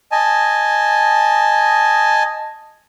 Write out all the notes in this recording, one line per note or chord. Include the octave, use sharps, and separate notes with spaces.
D#5 G#5 A5